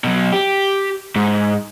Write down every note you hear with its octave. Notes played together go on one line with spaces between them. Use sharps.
B2 F#3
G4
G#2